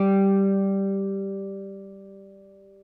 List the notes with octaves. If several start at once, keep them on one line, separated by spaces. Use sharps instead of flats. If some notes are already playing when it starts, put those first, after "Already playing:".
Already playing: G3